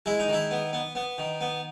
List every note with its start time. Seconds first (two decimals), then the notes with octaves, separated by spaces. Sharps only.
0.06 G#3 E4
0.19 D#4
0.28 D#3 E4
0.51 B3
0.73 B3
0.95 B3
1.18 D#3
1.41 B3